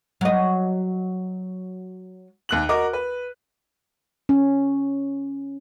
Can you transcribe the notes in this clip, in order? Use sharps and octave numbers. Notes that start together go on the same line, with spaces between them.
F#3 D#5
D#2 F#6 F#7
F#4 A#4 D#5 D6
B4
C#4